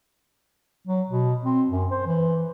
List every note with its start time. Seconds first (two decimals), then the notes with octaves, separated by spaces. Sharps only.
0.87 F#3
1.09 B2
1.45 C4
1.70 F#2
1.91 C5
2.06 E3